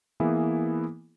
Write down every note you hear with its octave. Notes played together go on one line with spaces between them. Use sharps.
E3 A#3 B3 E4 G#4